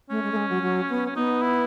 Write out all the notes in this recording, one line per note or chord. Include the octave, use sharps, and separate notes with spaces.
A3 C#4
G#3
A3
G#3
F#3
F#3
B3
C#4
B3 D#4
E4